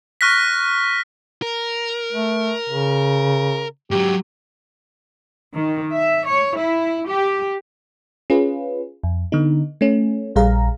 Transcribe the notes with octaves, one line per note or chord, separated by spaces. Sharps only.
C#6 F6 F#6 A#6 B6
A#4
A3
C#3
G#2 F#3 G4
D#3
E5
C#5
E4
G4
C#4 F4 G#4 B4
F2
D3 B3 D#4
A3 C#4
A#1 G3 G#4 F5 A#5